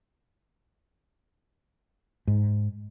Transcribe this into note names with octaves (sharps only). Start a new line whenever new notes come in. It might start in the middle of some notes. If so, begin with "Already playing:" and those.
G#2